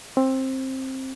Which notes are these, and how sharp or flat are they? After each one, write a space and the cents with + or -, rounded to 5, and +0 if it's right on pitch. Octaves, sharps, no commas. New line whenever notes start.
C4 +15